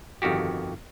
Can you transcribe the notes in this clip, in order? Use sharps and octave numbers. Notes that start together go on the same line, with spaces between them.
G1 F2 D#3 F#4 G4